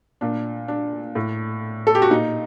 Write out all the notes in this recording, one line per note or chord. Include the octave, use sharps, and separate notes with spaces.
A#2 D4
D4
A2
A4
G4
F#4
A#2 D#4